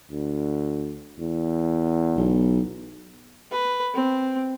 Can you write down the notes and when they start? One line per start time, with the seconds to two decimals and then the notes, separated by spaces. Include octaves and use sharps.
0.12 D2
1.20 E2
2.17 B1
3.51 B4
3.94 C4